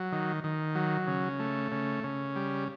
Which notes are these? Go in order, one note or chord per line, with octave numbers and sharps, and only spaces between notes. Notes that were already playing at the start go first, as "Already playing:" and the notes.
Already playing: F#3
D#3
D#3
F#3
C#3
A3
C#3
C#3
G3